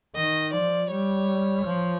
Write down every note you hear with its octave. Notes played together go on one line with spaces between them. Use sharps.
D#3 D#5
F3 D5
G3 C#5
F3